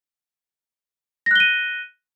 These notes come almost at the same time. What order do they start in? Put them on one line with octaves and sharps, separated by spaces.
A#6 F#6 G7 D#7